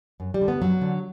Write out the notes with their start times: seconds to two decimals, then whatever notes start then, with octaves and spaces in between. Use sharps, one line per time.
0.20 F#2
0.34 G3
0.41 D3
0.48 B3
0.61 F#2 F#3
0.81 D3